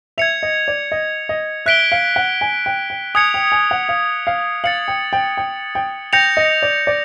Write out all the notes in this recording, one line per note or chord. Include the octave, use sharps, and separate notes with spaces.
E5 G#6 C#7 F7
D#5
D5
D#5
D#5
E5 F#6 B6 D7 G7
F5
F#5
G#5
G5
G5
G#5 D#6 G#6 C#7 F7
G5
G#5
F#5
F5
F5
F5 A6 C#7 F#7
G5
G5
G5
G5
G5 G6 A#6 C#7 F7
D#5
D5
D5